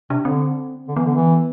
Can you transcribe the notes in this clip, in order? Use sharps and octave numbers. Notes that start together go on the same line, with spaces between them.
C3 D4
D3 C4
D3
E3 B3
D3
E3